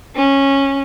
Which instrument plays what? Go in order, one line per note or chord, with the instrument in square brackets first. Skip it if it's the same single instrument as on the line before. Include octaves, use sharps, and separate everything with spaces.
[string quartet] C#4